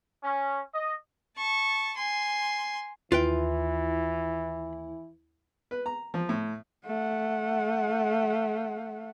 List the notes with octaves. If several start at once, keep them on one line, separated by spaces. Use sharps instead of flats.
C#4
D#5
A5 C#6
G#5 C6
D#2 E3 E4 F4 B4 G5
B4
A#5
F3
A2
A3 F#5